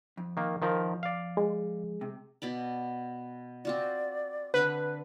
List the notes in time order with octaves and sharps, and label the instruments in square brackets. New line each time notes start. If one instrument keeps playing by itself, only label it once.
[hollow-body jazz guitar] F2
[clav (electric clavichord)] D#3 A#3
D#3 F3 A#4
D5 F5
[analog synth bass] G#3
[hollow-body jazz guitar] C3
[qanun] B2 D5 B5
[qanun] C4 F4 F#4 [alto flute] D5
[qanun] D3 C4 [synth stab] B4